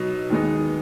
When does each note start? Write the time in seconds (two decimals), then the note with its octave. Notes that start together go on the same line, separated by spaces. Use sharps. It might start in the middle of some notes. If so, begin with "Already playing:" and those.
Already playing: B2 F#3 D#4
0.30 D#2 D#3 G#3 B3 D#4